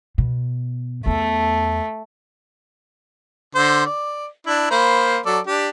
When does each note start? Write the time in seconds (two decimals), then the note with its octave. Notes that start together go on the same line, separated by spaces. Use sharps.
0.18 B2
1.06 E2 A3 B3
3.55 D3 C5
3.86 D5
4.47 D4 E4
4.70 A#3 C5 B5
5.26 F#3 A4 D5
5.47 D4 G4